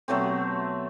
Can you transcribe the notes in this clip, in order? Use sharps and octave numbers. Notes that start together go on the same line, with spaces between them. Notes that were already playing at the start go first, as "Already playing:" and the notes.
B2 F#3 A3 C4